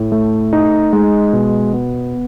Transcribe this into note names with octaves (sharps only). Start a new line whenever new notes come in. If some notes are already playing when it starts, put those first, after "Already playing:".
Already playing: A2
A3
D#4
G#3
B2
B3